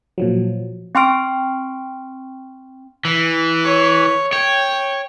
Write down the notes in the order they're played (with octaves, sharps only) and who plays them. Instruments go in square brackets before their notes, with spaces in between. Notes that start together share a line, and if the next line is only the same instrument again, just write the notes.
[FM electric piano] A#2 F3 F#3
[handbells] C4 G5 C6 C#6 F6 D7
[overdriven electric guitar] E3
[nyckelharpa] C#5
[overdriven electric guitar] C#5 [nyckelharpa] G5